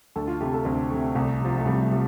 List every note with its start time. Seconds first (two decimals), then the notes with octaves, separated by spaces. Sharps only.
0.16 D2 A4
0.28 F4
0.41 C3 A3 G4
0.54 A4
0.65 D2 C4
0.90 C3 A3
1.15 C2 A3
1.41 C3 F3
1.58 A3
1.65 C2 G3
1.83 A3
1.91 C3 F3